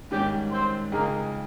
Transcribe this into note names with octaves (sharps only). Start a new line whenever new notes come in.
G#2 D#3 G3 C#4 G4 G5
C4 C5
F2 C#3 G#3 A#3 D#4 G#4 A#4